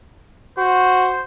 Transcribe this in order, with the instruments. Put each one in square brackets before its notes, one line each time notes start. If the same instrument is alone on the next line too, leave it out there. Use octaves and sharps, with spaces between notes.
[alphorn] F#4 [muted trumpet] C5